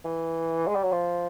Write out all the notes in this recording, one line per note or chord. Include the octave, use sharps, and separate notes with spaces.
E3
G#3
G3
F#3
F3